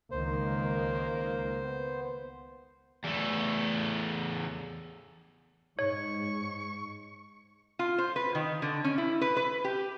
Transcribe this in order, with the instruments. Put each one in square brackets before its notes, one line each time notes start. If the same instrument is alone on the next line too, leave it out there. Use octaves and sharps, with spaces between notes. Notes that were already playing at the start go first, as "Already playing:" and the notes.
[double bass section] C#2 D#3 [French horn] A#3 [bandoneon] C5
[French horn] B3
[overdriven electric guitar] E2 A3
[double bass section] G#2 [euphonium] D#4 [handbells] C#5 [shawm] C#6
[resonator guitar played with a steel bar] F4
C5
B4
D#3
D3
C#4
E4
B4
B4
G4